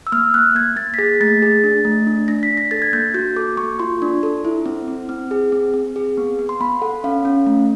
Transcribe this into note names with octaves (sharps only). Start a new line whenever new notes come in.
E6
A#3 F6
A#3 F#6
A#3 G#6
A#3 A6
B6
G#4 A#6
A3 A6
G#4
D4
A3
D4
D4 A#6
B6
D4
A#6
A4 A6
G#6
A#3 G6
F#4 G6
A4 D6
A#3 C#6
F4 C6
D4
A4
E4
C4
C4
C4
G#4
C4
C4
G#4
B3
B3
C6
B3 B5
A4 F#5
C#4 F5
C#4
A3